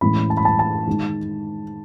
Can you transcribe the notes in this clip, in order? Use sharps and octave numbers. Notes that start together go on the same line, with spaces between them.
A2 E3 G#3 C#4 B5
A5
B5
A5
A5
D#3 G#3 D#4